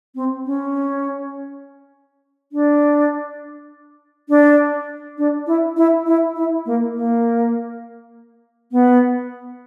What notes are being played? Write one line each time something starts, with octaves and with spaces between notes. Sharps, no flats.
C4
C#4
D4
D4
D4
E4
E4
E4
E4
A#3
A#3
B3